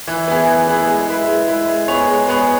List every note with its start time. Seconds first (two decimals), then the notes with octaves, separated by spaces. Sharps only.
0.07 E3
0.28 B3 E4 G#4
0.47 E3
0.67 B3 E4 G#4
0.87 G#3
1.08 E4 B4
1.28 G#3
1.48 E4 B4
1.68 G#3
1.88 B3 G#4 C#5
2.07 G#3
2.28 B3 G#4 C#5